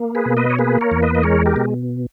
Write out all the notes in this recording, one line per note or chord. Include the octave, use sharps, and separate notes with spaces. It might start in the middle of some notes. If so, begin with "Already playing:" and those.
Already playing: A#3
G#4 B4
B2
B4 D#5
C#5
A#3 G#4 B4
A#4 C#5
E2
B4 D#5
D#5
G#3 A#4 C#5
G4 A#4
B2